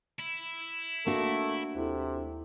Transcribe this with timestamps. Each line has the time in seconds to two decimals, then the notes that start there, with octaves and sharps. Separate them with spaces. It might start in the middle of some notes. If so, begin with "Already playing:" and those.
0.19 E4
1.06 A3 A#3 D4 F#4
1.74 D#2 C3 E4 A4